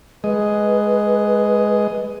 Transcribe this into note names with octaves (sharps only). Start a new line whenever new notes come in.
G#3 B4 D#5